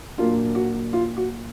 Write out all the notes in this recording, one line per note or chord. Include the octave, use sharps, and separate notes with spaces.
A#2 F#3 A#3 D4 F4
F#4
F4
F#4